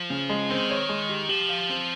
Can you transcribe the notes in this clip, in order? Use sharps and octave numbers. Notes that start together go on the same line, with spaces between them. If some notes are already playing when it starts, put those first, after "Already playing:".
Already playing: F3
C#3
G#3
D#3 C4
C#5
G#3
G4
F3 G4
F5
C4